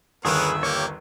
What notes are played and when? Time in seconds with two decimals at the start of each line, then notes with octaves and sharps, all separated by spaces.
0.25 G1 D#2 B3 G#4 A#4 B4 C#5 E5
0.63 A#3 G4 C#5